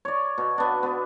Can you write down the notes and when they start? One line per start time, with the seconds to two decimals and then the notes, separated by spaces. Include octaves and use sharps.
0.05 C#5 D5
0.38 B2
0.58 B3 D4
0.83 B3